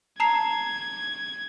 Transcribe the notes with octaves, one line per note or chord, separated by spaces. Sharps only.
A5 A#5 G#6 C7